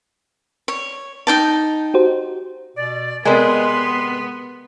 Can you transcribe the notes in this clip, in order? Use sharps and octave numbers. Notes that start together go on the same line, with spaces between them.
C#5
D#4 G5 A5
F#4 G4 C5
B2 D5
C3 G#3 B3 A#4 D5 G#5 C6